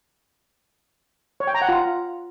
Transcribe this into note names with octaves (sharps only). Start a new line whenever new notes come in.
C#5
G5
A#5
F#5
F4